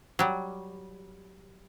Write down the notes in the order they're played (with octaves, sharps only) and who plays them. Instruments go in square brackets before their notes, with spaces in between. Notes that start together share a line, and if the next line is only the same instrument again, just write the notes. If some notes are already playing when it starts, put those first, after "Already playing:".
[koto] F#3 G3